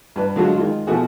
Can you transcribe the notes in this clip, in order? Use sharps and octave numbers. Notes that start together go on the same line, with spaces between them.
G2 B4
D3 F#3 G#3 F4 F#4
D#3 G#3 F4
B2 F3 A3 F#4 G#4